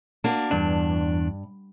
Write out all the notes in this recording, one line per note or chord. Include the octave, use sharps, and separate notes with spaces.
A#3 D4 F#4
E2 G2 D4